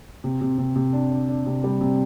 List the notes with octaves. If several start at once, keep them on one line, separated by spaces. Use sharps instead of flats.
C3
C3
C3
C3
D4
D4
D4
C3
G3
C3